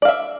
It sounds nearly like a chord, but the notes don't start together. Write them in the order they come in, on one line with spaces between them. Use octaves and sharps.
D5 F5 E5